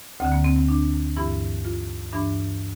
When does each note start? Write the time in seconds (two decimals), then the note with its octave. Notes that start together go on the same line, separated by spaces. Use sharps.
0.20 D2 D3 C4
0.32 A#3
0.44 C4
0.56 C4
0.68 D4
1.17 G2 E3 E4
1.65 F4
2.12 G2 E3 D4